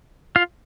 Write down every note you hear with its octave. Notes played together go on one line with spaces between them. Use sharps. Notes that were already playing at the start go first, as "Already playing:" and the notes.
F4 F5